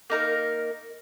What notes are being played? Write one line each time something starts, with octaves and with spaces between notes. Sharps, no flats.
A#3 D#4 A#4